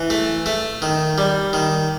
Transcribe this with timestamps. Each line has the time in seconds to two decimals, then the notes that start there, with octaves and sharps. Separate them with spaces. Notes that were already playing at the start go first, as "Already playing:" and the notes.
Already playing: E3
0.10 A3
0.46 A3
0.82 D#3
1.18 G3
1.53 D#3